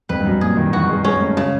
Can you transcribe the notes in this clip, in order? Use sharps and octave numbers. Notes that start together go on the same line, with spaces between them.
F2 B4
G2
F#2
A#2 G#4
D#3
E3 F#4
G#3
G#3 C#4
A3
C#3 G#3